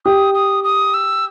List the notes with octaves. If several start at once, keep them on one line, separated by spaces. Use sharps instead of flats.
G4 D#6
D#6
D#6
E6